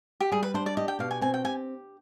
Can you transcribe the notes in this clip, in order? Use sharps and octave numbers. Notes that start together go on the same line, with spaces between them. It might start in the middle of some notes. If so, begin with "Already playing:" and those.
G4
G3 G#4
B4
D4 C5
D5
G4 D#5
G5
B2 F5
G#5
C4 G#5
G5
G4 G#5